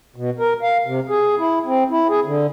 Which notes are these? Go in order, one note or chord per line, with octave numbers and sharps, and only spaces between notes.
B2
A#4
F5
C3
G#4
E4
C4
E4
G#4
D3